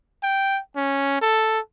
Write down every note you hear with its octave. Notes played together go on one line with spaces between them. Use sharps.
G5
C#4
A4